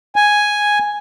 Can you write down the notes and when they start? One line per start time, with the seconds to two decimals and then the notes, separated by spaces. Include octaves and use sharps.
0.16 G#5